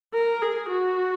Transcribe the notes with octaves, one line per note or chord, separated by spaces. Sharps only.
A#4
G#4
F#4